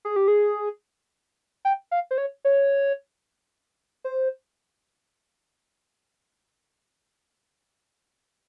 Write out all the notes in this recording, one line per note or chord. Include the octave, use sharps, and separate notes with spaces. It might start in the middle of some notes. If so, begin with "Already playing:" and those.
G#4
G4
G#4
G5
F5
C5
C#5
C#5
C5